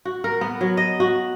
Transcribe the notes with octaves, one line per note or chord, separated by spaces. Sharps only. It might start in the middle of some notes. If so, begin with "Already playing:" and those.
F#4
A#4
B3
F#3
D#5
F#4